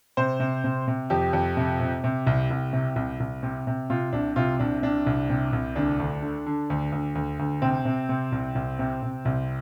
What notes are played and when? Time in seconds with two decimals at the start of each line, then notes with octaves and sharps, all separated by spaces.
0.17 C3 C5
0.40 C3
0.64 C3
0.88 C3
1.10 F2 G4
1.33 F2
1.57 C3
1.80 C3
2.04 C3
2.27 C2
2.50 C2
2.73 C3
2.96 C2
3.20 C2
3.43 C3
3.67 C3
3.90 C3 F4
4.13 C2 D4
4.36 C3 F4
4.59 C2 D4
4.82 C3 D4
5.06 C2
5.30 C3
5.53 C2
5.75 D2 D4
6.00 D2
6.22 D3
6.46 D3
6.70 D2
6.92 D2
7.15 D2
7.39 D2
7.62 C3 C4
7.85 C3
8.09 C3
8.32 C2
8.55 C2
8.79 C3
9.03 C3
9.25 C2